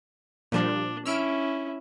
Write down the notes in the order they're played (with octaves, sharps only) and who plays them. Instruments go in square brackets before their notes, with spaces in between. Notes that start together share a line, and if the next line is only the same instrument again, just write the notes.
[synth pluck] A#2 F3 G3 [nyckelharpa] D4
[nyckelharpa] C#4 E4 [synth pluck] E6 F6 D7